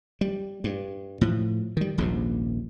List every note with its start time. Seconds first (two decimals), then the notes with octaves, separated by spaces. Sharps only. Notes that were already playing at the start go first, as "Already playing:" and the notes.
0.21 G3
0.64 G2
1.21 A2 F3
1.77 D#3 G3
1.98 D#1 A#1 D#2 G#2